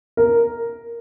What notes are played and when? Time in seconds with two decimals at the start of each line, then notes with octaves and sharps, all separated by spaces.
0.17 A#4